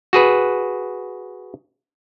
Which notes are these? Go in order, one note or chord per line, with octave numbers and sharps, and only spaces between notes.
F#4 G#4 B4